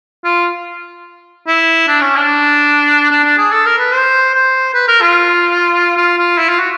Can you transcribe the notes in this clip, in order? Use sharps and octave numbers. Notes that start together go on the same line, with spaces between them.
F4
E4
D4
C#4
D4
D4
D4
G#4
A4
A#4
B4
C5
C5
B4
A#4
F4
F4
F4
E4
F4
F#4